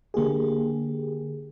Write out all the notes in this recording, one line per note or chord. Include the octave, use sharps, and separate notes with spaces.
D3 A#3 G4 G#4